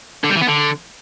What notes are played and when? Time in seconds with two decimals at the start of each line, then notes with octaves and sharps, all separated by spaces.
0.24 D3
0.30 G3
0.36 E3
0.42 B3
0.48 D3